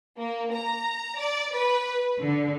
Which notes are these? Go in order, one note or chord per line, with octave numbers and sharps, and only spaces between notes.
A#3
A#5
D5
B4
D3